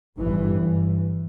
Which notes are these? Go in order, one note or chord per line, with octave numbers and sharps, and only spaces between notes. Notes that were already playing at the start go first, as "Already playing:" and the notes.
G1 G2 E3